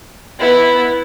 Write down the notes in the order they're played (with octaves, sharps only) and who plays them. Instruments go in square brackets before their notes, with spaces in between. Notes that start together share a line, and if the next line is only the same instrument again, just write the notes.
[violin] B3 E4